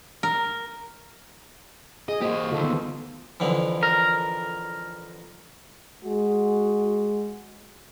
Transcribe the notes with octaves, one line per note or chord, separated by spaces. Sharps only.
A#4
G#4 D#5
A#3 F#4 G4 C5 D#5
D2 D#3 F4 A4
B3
F2 D3 E3
A#4
G#3 F#4